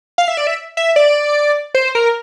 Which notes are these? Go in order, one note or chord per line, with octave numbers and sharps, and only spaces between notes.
F5
E5
D5
E5
E5
D5
C5
A#4